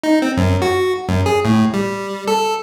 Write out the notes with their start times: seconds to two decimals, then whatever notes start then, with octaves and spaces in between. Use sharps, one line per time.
0.04 D#4
0.22 C4
0.37 F#2
0.62 F#4
1.09 F#2
1.26 G#4
1.45 A2
1.74 G3
2.28 A4